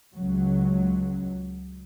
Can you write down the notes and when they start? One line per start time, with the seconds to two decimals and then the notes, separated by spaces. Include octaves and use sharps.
0.16 C#2 F#3